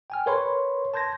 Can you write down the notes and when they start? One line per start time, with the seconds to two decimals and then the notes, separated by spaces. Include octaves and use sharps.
0.10 G5 G#5 F6
0.26 A#4 B4 C#5 B5 C6
0.94 A5 C6 G6 G#6 A#6